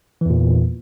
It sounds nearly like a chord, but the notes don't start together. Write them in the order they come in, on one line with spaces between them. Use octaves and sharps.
E3 E2 A#2